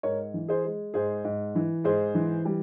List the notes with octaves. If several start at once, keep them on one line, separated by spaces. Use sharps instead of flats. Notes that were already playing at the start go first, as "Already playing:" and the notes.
G#2 A#4 C#5
E3
G#4 C5
G#3
G#2 G#4 C5
G#2
E3
G#2 G#4 C5
E3
G3